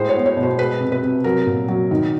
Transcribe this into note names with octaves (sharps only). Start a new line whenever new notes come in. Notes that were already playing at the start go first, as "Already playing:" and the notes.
Already playing: A2 G#3 C5
C#5
B3
C#5
B2
C5
G#3 B4
C3
B4
C3
F#3 A#4
A#2
F#3
D#3